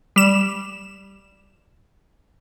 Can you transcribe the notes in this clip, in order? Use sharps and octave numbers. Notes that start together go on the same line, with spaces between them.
G3 E7